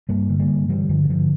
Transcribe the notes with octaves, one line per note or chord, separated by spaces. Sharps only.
G2 G3 A#3
D3
G3 A#3
G2
D3 E3 G3
G2 D3 F3
G3
G2 D3 F3